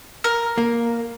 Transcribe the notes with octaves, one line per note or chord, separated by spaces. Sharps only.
A#4
A#3